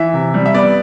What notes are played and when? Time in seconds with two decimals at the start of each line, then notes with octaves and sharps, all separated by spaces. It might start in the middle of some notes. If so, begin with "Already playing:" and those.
Already playing: E3 E5
0.14 C3
0.34 G3
0.46 E5
0.54 B3 D5